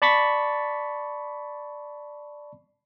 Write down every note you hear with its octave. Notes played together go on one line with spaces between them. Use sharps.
D5 A5 B5 C#6 A6 B6